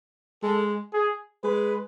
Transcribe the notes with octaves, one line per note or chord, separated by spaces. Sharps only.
G#3 A4
G#4
G#3 B4